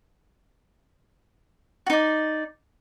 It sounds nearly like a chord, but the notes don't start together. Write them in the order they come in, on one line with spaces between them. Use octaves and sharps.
F#4 D#4 D5